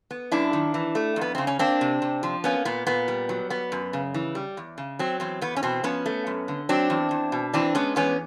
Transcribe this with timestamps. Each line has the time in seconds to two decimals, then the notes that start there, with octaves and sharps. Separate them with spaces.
0.11 B3
0.32 F#2 D4 E4
0.53 D#3
0.74 E3
0.95 A3
1.16 F2
1.21 B3
1.35 C#3 C4
1.47 C#4
1.59 A#3 C4 D4
1.81 C3
2.02 C3
2.23 F3
2.44 A#3 B3 C#4
2.65 A#2 B3
2.87 A#2 B3
3.08 G3
3.29 F#3
3.50 B3
3.72 F#2
3.93 C#3
4.14 E3
4.35 G3
4.57 E2
4.78 C#3
4.99 F#3 C4
5.20 E2 C4
5.41 E2 B3
5.57 C#4
5.63 B2 C4
5.83 F3 B3 C#4
6.06 A3
6.27 F#2
6.48 D3
6.69 F#3 C4 D4
6.90 E2
7.11 E2
7.32 B2
7.54 E3 C4 D4
7.75 G#3 B3 C#4
7.96 E2 B3 C#4